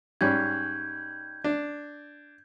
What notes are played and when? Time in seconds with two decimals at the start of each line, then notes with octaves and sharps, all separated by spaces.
0.21 G#2 G3 C#4 G6 G#6
1.44 D4